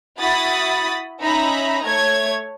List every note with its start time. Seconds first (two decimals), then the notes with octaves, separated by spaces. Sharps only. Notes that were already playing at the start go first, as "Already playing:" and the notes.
0.19 E4 F#4 B5 D#6 A6
1.21 C#4 D#4 E5 A#5 B5
1.84 A3 C#5 G#6